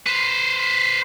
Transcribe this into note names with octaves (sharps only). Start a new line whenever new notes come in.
B4 C5